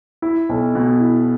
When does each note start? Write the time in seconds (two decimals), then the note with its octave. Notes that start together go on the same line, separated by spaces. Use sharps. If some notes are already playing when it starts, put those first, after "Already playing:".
0.22 E4
0.49 B1
0.75 B2
1.00 E4